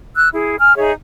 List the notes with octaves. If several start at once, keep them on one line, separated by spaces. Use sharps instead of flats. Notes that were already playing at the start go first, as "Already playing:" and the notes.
E6 F#6
E4 G#4
G#5 F6
D#4 G#4 C#5 E5